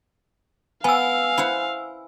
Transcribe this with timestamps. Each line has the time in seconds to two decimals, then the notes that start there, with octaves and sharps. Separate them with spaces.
0.84 B3 F5 G#5 E6
1.38 E4 C5 F#5